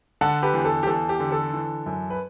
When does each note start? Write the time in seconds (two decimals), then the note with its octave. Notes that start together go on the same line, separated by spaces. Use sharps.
0.21 D3 F#5 A5
0.42 G4 B4
0.54 E2
0.65 A4
0.83 G4
0.87 E2 A4
1.09 G4
1.20 D3
1.32 A4
1.53 E3
1.86 F#2
2.10 B4